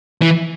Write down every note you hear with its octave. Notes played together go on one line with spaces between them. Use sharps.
E3